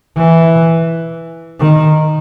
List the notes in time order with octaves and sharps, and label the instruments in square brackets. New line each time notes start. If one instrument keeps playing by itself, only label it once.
[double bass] E3
D#3